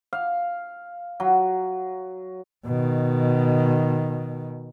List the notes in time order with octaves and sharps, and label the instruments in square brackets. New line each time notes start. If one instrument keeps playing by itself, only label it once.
[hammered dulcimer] F5
F#3
[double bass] B2 D#3